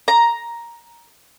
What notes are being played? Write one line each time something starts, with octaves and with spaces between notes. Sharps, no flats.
A#5